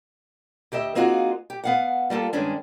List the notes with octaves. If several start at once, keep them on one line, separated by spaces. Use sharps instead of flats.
D2 G4 D#5 E5
A#3 C4 D#4 F4 F#4 G#4
G4
B3 F5 F#5
G3 A#3 F4 A4
G2 D#3 G#3 C#4 D4